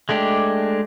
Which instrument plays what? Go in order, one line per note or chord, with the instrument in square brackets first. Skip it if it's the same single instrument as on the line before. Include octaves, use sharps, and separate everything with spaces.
[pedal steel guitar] G#3 A3 D4 G4